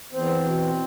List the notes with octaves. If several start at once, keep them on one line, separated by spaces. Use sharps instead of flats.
E2 C4
B2